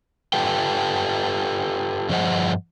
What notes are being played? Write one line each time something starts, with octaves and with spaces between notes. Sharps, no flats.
F4 G4 A4 B4 G5
G2 F3 G#4 C5 D#5 F#5